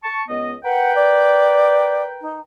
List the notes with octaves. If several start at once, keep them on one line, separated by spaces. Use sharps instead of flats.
A5 C#6
C#2 B3 D#5
A#4 B4 F#5 G5
D5
D#4